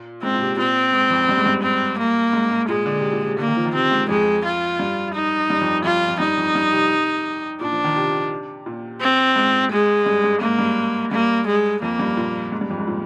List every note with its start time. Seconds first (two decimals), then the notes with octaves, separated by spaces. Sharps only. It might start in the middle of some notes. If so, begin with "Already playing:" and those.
Already playing: A#2
0.22 G#2 C4
0.34 A#2
0.40 C3
0.58 A#2 C4
0.93 G#2
1.10 F2
1.29 G2
1.37 G#2
1.46 G2
1.63 C4
1.98 A#3
2.33 G#2
2.51 G#2
2.68 A#2 G#3
2.86 D3
2.99 C3
3.12 A#2
3.26 C3
3.38 D3 A#3
3.48 D#3
3.57 F3
3.66 D#3
3.74 C3 C4
3.92 G#2
4.09 F2 G#3
4.45 F4
4.79 G2
5.14 D#4
5.50 G2
5.61 F2
5.84 F2 F4
6.08 F2
6.20 G2 D#4
6.37 F2
6.55 G2
6.73 C3
7.60 A#2 D4
7.73 F3
7.84 D#3
7.96 C3
8.66 A#2
9.01 C4
9.36 G#2
9.72 G#3
10.06 G2
10.24 G#2
10.41 G#2 A#3
10.59 G2
11.11 G2 A#3
11.47 G#3
11.81 F2 A#3
11.99 G2
12.17 A#2
12.52 G#2
12.61 G2
12.70 F2
12.78 G#2
12.87 A#2